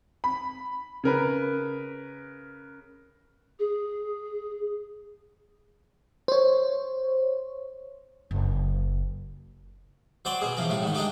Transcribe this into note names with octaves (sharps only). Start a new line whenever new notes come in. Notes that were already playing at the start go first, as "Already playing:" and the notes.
B5
C#3 A#4 B4
G#4
C5 C#5
F#1
F#3 C5 D5 G5
B2 G#4
E2 F3 A#5
A2 G3
G#2 D#3
G#3 D4 D#4 G4